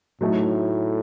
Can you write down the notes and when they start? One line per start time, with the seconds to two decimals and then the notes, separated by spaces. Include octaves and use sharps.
0.21 A2 F#3 A3 D#4 A4